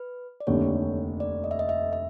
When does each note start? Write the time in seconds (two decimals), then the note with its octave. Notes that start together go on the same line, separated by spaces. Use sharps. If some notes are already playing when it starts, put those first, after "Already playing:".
Already playing: B4
0.40 D5
0.47 F1 D#2 D3 C#5
1.20 D5
1.44 D#5
1.51 E5
1.59 D#5
1.69 E5
1.93 E5